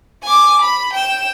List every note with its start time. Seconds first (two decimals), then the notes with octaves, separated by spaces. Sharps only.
0.23 G#5 D6
0.61 B5
0.93 G5 E7